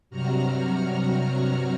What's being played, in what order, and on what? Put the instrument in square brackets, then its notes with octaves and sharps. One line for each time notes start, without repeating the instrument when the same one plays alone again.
[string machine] G2 C3 F#3 F#4 A#5 F6